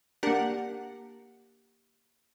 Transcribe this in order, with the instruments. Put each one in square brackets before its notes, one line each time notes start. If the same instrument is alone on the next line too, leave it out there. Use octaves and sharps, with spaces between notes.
[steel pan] A#3 G4 [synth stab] D4 A#4 F#5